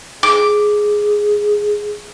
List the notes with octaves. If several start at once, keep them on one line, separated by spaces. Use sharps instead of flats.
G#4 D6